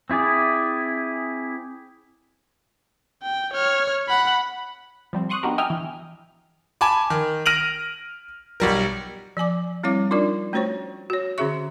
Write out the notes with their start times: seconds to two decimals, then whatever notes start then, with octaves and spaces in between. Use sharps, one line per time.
0.10 C4 E4 G#4 D5
3.23 G5
3.53 C#5 F6
4.08 F#5 B5
5.13 F3 G3 C4
5.29 C6 C#6 D#6 F#6
5.43 B3 D4 D#4 F#4 G4 A#4
5.58 D#5 E5 G5 G#5 F6
5.70 E3
6.81 G#5 A5 B5 D6
7.10 D#3
7.46 F6 A#6 D7 D#7 F7 F#7
8.60 B1 G3 A#4
9.37 F3 D5 G#5 D6
9.83 G3 C4 E4 C#5 F5 D6
10.11 D4 D#4 F4 A#4 D5
10.53 A3 C#4 F#4 C5 C#5 C#6
11.10 F#4 C#5
11.38 D3 C#4 F#4 G#4 E5 C#6